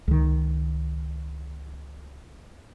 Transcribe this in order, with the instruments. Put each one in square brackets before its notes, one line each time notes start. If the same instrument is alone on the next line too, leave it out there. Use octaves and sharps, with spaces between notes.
[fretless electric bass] C#2 D#3